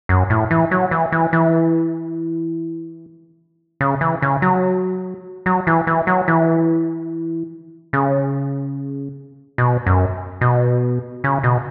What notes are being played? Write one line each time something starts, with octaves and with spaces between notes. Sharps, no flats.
F#2
A2
E3
F#3
E3
E3
E3
C#3
E3
C#3
F#3
F#3
E3
E3
F#3
E3
C#3
B2
F#2
B2
C#3
B2